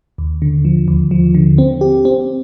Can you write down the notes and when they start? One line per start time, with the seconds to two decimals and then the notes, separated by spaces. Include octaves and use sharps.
0.18 D#2
0.42 D3
0.65 F3
0.88 D#2
1.11 F3
1.35 D3
1.58 C4
1.81 G4
2.05 C4